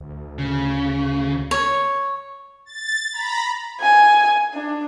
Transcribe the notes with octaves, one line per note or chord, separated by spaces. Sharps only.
D2
C#3
C#5
A6
A#5 B5
G#5
D4